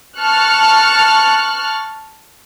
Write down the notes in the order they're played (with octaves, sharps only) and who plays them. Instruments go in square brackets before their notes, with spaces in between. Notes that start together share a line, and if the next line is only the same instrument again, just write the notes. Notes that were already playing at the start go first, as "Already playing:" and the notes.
[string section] A5 C#6 F6 F#6